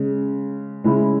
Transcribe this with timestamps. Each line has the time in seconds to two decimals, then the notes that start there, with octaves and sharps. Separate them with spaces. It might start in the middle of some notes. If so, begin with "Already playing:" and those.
Already playing: C#3 G#3 C#4
0.84 C#3 G#3 E4